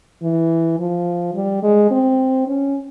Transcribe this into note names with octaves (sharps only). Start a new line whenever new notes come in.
E3
F3
G3
G#3
C4
C#4